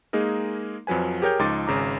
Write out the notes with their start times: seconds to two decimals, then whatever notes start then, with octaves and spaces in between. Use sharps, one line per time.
0.13 G#3 A#3 D#4 G#4 A#4
0.87 F2 F3 F#3 B4 G#5
1.22 G4 G#4 A#4 C#5 G5 G6
1.39 C#2 F3 D#4 C6 D6 A6
1.67 G#1 C#3 A#5 D6